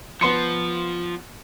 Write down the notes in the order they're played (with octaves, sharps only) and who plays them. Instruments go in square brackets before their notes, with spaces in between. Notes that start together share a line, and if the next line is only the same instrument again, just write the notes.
[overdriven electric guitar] F3 [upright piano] B3 C6 C#7